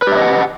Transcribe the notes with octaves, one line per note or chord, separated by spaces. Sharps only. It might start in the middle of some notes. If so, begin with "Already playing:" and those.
G4 B4 D#5 E5 F#5